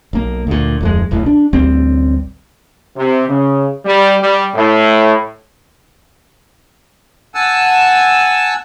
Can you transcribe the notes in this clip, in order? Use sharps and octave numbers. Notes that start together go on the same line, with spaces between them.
B1 A#3
D2 A#2
D1 F2 G#3
E1 B1 A2
D4
A1 D2 G3 C4
C3
C#3
G3
G3
A2
F#5 G#5 A5 E6